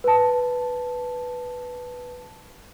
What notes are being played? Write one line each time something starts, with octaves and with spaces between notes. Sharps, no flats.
B4 A5